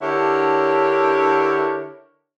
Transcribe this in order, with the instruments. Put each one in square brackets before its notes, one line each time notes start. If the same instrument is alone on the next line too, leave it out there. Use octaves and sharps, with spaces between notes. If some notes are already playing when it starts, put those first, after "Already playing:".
[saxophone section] D3 D4 E4 G4 A#4 C#5